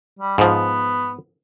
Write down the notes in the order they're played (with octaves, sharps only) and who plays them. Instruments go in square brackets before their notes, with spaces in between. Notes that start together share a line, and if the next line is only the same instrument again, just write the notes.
[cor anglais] G3
[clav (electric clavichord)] G#2 F3 [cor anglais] B3